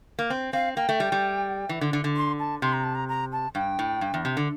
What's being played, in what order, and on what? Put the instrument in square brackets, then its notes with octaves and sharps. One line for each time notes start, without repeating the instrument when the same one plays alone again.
[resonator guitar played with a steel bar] A#3
C4
[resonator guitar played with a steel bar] C4 [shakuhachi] F5
[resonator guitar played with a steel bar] A#3 [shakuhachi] G5
[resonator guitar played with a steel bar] A3
G3
G3
E3
D3
D3
D3
[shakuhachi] C6
A5
[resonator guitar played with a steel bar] C3 [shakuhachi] C6
[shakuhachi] A#5
A5
A#5
A#5
A5
[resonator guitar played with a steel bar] G2 [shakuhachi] G5
[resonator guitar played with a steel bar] A2
G2
E2
C3
D3